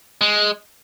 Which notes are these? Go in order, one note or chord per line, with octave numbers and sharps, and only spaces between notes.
G#3